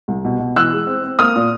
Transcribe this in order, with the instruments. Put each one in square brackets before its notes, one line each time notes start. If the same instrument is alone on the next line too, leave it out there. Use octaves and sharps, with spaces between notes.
[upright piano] C2
B2
B2
E3 E6 F#6
G#3
C4
C4
A#3 D#6 F6
A#2